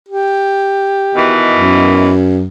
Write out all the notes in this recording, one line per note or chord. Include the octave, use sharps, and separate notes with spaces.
G4
B2 D#3 E3
F#2